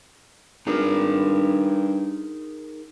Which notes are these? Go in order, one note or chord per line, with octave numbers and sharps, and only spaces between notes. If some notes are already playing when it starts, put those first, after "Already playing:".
G2 D#4 G#4 A#4